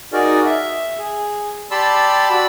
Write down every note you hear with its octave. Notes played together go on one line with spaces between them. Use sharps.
D#4 F#4 G#4 A#4 D5
E5
G#4
G4 D5 A5 B5 C6 E6
F#4 D5 B5 E6